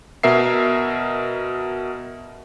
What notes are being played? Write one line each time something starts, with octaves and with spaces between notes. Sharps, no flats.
B2 A#4 E5 C7